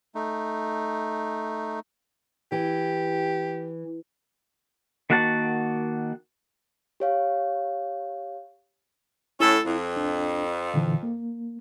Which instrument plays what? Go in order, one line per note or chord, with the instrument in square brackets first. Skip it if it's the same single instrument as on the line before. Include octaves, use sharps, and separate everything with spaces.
[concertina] A3 D#4
[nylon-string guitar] E3 [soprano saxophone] G4
[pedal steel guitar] D#3 A#3 F#4 F#5 A5
[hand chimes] G4 C#5 F5
[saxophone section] A2 C#4 A4 [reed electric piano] E4
[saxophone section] F2
[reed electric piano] C2 D4
A#2 D3 E3
A#3